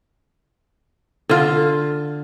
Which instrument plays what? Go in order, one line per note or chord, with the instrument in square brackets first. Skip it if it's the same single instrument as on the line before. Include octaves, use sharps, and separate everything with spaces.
[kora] D3 F4